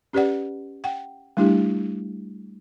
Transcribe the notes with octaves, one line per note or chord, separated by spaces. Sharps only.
C#4 G4 B4 D5 F#5
F#5 G5
G3 A3 D4 E4 G4